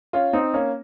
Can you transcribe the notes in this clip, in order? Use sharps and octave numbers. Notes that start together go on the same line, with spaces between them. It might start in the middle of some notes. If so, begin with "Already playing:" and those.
C#4 F4
C4 D#4
A#3 C#4